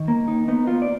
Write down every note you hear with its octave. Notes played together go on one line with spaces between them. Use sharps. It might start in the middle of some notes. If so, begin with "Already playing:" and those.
Already playing: D#3
A#3
D#4
B3 D#4
B3 F4
D5